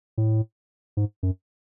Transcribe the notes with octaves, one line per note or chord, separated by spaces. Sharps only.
A2
G#2
F#2